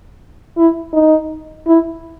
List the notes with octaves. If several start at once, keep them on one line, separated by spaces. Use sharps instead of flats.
E4
D#4
E4